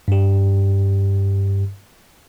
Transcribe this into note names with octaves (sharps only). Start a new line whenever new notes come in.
G2 G4